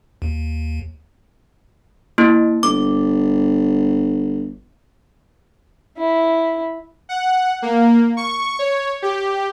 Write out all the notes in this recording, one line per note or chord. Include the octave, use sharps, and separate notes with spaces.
D#2
A#3 E4
G1 D6
E4
F#5
A#3
C#6
C#5
G4